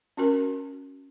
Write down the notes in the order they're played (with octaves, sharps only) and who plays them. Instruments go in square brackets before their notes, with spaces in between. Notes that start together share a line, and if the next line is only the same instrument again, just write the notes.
[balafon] C#4 F#4 A#4